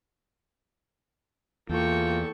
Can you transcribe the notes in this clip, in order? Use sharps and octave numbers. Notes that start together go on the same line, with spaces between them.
E2 A#3 F4 A4 G5 C#6